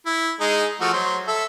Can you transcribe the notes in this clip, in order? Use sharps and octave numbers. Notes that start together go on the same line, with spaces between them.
E4
G#3 D#4 G#4
F3 A3 F#4
F#3 C5
A4 E5